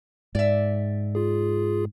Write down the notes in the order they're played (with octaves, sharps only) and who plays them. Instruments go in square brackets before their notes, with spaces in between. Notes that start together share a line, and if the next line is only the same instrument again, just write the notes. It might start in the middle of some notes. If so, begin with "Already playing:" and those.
[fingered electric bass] G#2 [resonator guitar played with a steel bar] D5 E5
[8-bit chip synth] F4 G#4